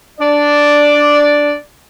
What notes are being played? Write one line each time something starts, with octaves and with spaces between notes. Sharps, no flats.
D4 D5